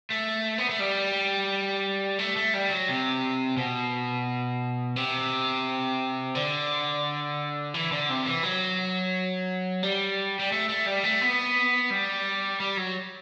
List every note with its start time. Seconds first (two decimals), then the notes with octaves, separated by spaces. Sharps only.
0.10 A3
0.58 B3
0.69 A3
0.80 G3
2.19 A3
2.36 A3
2.54 G3
2.70 F#3
2.88 C3
3.57 B2
4.96 C3
6.35 D3
7.74 E3
7.92 D3
8.09 C3
8.26 E3
8.43 F#3
9.83 G3
10.39 G3
10.52 A3
10.69 A3
10.86 G3
11.04 A3
11.21 B3
11.90 G3
12.60 G3
12.77 F#3